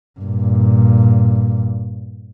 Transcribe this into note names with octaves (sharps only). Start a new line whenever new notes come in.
G2 A#2